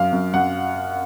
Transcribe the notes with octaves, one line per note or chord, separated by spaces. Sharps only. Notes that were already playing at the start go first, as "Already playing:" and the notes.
Already playing: F#2 F5
F#2
F#2 F#5